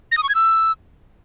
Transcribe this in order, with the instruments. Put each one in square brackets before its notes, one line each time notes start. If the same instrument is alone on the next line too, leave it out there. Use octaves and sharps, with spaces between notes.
[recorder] A#6
D#6
C#6
G#6
E6